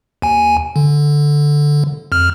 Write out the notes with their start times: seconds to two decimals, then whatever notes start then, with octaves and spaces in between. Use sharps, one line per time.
0.22 D#2 G#5
0.76 D3
2.12 F2 F6